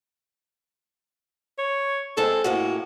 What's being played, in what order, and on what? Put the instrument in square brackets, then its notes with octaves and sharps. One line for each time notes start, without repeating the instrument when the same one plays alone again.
[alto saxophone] C#5
[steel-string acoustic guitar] G#3 C4 G#4 [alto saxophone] A4
[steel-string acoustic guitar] A2 A#3 C#4 [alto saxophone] F#4